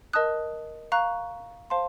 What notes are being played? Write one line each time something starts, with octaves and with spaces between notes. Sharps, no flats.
A#4 D#5 A5 D#6 F#6
F5 A#5 C#6 F#6
C5 F5 A5 C6